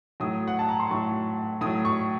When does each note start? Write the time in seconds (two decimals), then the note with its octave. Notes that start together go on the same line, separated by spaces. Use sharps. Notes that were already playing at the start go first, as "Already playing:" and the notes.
0.20 A2 F#3 D#6
0.48 F#5
0.59 A5
0.69 A#5
0.80 C6
0.91 A2 F#3 C#6
1.61 A2 D#6
1.66 F#3
1.85 C#6